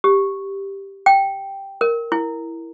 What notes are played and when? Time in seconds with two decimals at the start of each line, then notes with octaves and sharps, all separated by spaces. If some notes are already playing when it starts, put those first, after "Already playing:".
0.04 G4
1.06 G5
1.81 A#4
2.12 E4